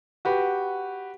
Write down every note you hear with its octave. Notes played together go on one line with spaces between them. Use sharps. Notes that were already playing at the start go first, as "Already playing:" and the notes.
F#4 G4 B4